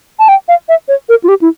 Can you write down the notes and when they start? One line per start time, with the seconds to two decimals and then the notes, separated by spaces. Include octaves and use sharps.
0.19 A5
0.28 G5
0.48 F5
0.69 E5
0.88 C#5
1.09 A#4
1.24 F4
1.28 G4
1.41 E4